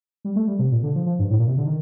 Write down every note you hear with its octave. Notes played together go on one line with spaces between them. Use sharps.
G3
A3
G3
C3
A#2
D3
F3
F3
G2
A2
A#2
C3
D3
D#3